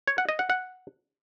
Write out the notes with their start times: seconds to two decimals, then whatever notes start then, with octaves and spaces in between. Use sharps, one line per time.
0.08 C#5
0.18 F#5
0.29 D#5
0.39 F#5
0.50 F#5